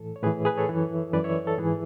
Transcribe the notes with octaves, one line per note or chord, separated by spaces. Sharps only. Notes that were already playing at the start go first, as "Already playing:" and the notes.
Already playing: A2 E3 A4
C#5
A2 E3 G#4 B4
G#4 B4
A4 C#5
F#2 E3
F#2 E3 B4 D5
C#5 E5
A4
G#2 E3 G#4